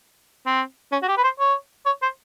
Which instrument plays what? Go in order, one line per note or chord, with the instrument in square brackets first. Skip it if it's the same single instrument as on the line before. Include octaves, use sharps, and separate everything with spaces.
[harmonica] C4
C#4
F#4
G4
B4
C5
C#5
C#5
C5